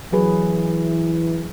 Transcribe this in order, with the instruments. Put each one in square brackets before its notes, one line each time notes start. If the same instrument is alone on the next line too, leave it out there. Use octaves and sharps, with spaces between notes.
[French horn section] E3 [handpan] F#3 G#4 B4